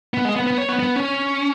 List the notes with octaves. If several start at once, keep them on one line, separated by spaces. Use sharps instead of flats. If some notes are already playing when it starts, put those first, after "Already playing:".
B3
G#3
B3
B3
C#5
B3
B3
C#4